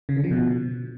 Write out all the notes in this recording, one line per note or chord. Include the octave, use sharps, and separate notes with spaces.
C#3
D3
F3
B2